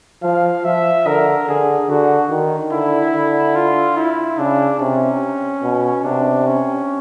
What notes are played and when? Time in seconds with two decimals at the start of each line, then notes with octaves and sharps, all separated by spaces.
0.23 F3 F5
0.64 F3 E5
1.06 D3 A#4
1.47 D3 G#4
1.89 D3 F#4
2.30 D#3
2.72 D3 E4
3.14 D3
3.55 F4
3.97 E4
4.38 C#3 D4
4.80 C3 C#4
5.63 B2
6.05 C3 D4
6.47 C#4